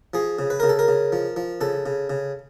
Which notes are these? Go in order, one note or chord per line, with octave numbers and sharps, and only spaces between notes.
F3 G#4
C#3
B4
C#3 A#4
A4
A#4
C#3
F3
F3
C#3 A4
C#3
C#3